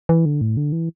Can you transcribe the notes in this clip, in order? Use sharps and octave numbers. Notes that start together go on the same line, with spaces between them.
E3
D3
A2
D3
E3